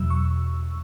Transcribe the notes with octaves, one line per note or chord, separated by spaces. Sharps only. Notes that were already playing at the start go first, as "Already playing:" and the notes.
Already playing: E2 B2 F#3 E6
C#6